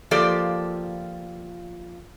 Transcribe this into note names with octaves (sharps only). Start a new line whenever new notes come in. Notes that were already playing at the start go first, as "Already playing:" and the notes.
F3 A#3 F4 G4 A4 D5